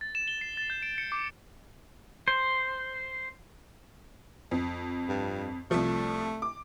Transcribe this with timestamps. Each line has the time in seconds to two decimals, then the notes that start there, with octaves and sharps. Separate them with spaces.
0.01 A6
0.15 E7
0.28 G7
0.41 C7
0.57 A6
0.70 G6
0.83 D7
0.98 C#7
1.12 D6
2.28 C5
4.51 F2
5.09 G2
5.71 C2 F3 A3
6.42 D6